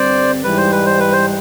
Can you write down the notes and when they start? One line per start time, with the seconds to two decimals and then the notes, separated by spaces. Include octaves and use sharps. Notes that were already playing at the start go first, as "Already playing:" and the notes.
Already playing: G2 D3 G3 C4 C5 D5
0.43 G#2 E3 G3 B4
0.58 C5
0.72 B4
0.86 C5
1.00 B4
1.12 C5